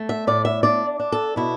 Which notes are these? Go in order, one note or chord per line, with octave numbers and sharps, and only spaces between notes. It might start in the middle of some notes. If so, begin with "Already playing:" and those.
Already playing: A3
E5
A2 D5
E5
D4 D5
D4
A4
B2 E4